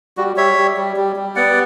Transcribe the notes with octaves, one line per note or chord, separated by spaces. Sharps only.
G3 F#4
G3 C#5 E5
G3
G3
G3
G3
B3 D5 F#5